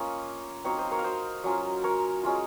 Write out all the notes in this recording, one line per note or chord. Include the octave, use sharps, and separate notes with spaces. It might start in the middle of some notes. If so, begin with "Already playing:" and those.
Already playing: A#3 C#4 F4 C#5 D#5 F5
F#3 C4 D#4 C#5 F5
C5 D#5
A#4 C#5
F5
C5 D#5
F#3 C#4 F4
A#4 C#5
G#3 C#4 F4